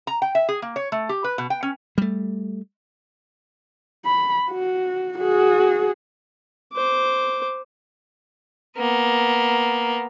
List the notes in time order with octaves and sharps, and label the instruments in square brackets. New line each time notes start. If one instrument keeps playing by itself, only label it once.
[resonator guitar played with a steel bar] A#5
G5
E5
G#4
A#3
C#5
A3
G4
B4
B2
G5
C#4
[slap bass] G3 A3
[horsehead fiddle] B5
F#4
F#4 G#4
[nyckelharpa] C5 D6
[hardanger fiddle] A#3 B3